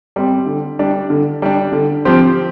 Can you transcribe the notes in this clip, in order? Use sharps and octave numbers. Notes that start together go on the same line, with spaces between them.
G3 C4
D3
G3 D4
D3
G3 D4
D3
F3 C4 G4 C5